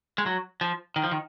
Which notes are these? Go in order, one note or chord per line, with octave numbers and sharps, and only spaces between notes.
G#3
F#3
F3
D#3
F3
D#3